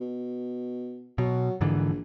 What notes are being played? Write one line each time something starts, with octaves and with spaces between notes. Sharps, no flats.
B2
B2 F#3
A#1 G#2 D3 E3